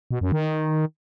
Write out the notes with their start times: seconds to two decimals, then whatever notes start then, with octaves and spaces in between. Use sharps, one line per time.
0.11 B2
0.21 F#2
0.32 D#3